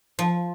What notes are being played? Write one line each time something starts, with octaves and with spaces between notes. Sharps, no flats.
F3